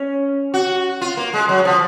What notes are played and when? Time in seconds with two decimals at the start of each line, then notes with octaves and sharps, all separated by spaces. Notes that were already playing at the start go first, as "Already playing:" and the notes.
Already playing: C#4
0.54 F#4
1.01 F4
1.17 A#3
1.34 G#3
1.49 F#3
1.65 F3